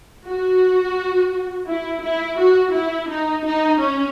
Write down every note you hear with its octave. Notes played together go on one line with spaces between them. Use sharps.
F#4
E4
E4
F#4
E4
D#4
D#4
C#4